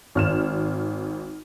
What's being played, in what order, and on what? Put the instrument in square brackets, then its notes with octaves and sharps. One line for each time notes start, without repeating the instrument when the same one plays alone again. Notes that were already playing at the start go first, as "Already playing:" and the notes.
[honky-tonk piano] G#1 F6 E7